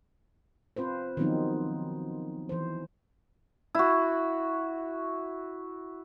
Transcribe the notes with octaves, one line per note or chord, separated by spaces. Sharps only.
C4 F4 B4 C5
D#3 F3 F#3 B3 C4 D#4
E3 C5
E4 F#4